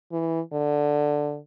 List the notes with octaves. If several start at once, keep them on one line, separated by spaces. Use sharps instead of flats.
E3
D3